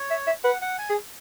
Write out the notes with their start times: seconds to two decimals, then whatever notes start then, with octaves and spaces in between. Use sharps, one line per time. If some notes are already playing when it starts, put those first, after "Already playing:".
Already playing: C#5
0.10 E5
0.27 E5
0.44 B4 F#5
0.61 F#5
0.78 G#5
0.90 G#4